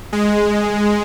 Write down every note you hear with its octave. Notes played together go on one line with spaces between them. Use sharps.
G#3